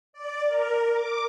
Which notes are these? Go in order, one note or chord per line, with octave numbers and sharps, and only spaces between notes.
D5
A#4
D6